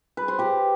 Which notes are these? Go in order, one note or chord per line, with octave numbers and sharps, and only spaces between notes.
B4
C5
G4 B4